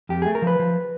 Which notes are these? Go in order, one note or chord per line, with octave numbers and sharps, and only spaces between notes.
F2 G4
A3 G#4
A#4
F3
B4
F3